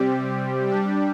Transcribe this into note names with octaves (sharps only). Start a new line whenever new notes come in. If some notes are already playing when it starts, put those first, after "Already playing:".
Already playing: C3 G3 C4 G4
G3 D4 G4